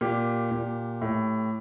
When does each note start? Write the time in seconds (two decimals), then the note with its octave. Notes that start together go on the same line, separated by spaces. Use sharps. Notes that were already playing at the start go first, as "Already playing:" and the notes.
0.01 A#2 G4
0.51 A#2
1.02 A2